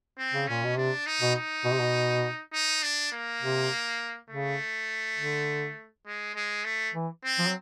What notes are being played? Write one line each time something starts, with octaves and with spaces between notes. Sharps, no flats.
C4
C#3
A#2 C#4
B2
C3 D4
D#4
B2
D#4
B2
C3
B2
D#4
D4
A#3
C3
C#3 A3
D3
G#3
G#3
A3
E3
C4
F3
F#3